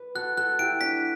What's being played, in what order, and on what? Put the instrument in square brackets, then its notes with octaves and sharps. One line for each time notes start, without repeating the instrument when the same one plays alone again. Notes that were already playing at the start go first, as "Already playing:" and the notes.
Already playing: [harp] B4
[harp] F#4 A4 [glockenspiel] F#6
[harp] F#4 A4 [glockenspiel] F#6
[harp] E4 G4 [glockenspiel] D7
[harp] D4 F#4 [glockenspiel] B6